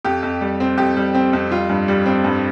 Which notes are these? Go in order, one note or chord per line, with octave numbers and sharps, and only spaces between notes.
F2 G4
F2
G3
C4
F2 G4
G3
C4
F2
G3 F4
G2
G3
C4
G2